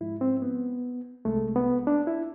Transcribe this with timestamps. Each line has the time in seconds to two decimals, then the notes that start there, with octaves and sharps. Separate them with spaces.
0.01 G#2 F3 G#3 E4
0.21 C4
0.42 B3
1.25 C2 C3 G#3 A3
1.56 B3
1.87 D4
2.07 E4